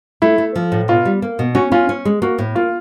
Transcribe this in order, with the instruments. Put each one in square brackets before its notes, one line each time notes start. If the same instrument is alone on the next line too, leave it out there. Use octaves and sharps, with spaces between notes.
[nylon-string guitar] A3 [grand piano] E4
[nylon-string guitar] A3
F3
A2
[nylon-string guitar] B2 [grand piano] F4
[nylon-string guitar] G3
A#3
B2
[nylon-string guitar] C#4 [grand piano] F#4
[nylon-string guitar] C#4 [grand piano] F4
[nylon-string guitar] C#4
G#3
[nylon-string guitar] A#3 [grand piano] F#4
[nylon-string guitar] A2
[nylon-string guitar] A#3 [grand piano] F4